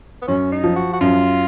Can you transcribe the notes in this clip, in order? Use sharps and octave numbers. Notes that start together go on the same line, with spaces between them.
B3
F#2 C#4
D#4
F3
F#4
F#4
F#2 F4